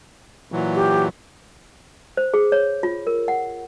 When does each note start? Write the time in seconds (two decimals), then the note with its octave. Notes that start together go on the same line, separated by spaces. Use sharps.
0.52 A#2 E3 F#3
0.75 G4
2.17 C5
2.34 G#4
2.52 C#5
2.83 F4
3.07 A#4
3.28 F#5